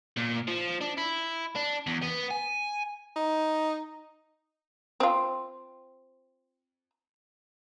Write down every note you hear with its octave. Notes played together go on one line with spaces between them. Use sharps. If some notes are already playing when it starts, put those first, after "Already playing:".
A#2
F3
D4
E4
D4
E2
B3
G#5
D#4
C4 F4